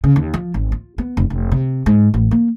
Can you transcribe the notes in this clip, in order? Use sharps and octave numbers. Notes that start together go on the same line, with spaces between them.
C#3
D#2
F3
G#1
F4
B3
F1
F1
C3
G#2
A1
A#3